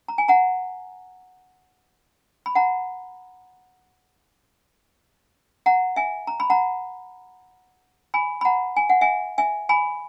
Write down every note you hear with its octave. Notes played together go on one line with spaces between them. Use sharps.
A#5
G#5
F#5 A#5
B5
F#5 A#5
F#5 A#5
E5 G#5
A#5
B5
F#5 A#5
G#5 B5
B5
F#5 A#5
G#5
F#5
E5 G#5
E5 G#5
G#5 B5